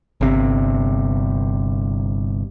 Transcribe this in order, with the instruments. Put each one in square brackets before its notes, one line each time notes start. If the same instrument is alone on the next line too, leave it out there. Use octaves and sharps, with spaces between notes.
[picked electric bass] G1 C3